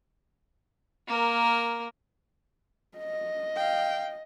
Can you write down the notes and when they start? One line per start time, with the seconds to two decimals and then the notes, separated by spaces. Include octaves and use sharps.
1.07 A#3 A#4
2.97 D#5
3.56 F5 G5